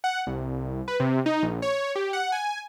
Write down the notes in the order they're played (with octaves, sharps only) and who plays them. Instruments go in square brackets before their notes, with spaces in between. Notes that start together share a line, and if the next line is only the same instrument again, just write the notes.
[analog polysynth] F#5
C2
B4
C3
D#4
A#1
C#5
G4
F#5
G#5